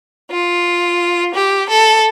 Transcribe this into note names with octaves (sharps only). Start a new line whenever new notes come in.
F4
G4
A4